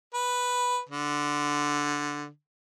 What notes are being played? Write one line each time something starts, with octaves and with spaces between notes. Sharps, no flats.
B4
D3